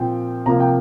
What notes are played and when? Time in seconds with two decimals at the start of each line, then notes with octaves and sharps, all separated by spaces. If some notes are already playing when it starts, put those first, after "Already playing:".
Already playing: A#2 F3 C4 G5
0.46 C3 F3 A#3 A#5
0.60 G5